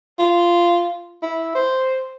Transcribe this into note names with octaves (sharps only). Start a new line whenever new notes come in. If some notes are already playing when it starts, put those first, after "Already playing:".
F4
E4
C5